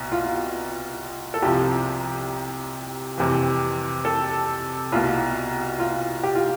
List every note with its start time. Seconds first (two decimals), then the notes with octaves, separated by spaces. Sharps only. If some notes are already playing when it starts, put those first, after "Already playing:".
Already playing: C2 B2
0.12 F4
1.34 A4
1.42 C2 C3 F3 G4
3.18 F2 C3 E3
4.05 A4
4.92 C2 B2 F4
5.79 F4
6.23 G4
6.35 F4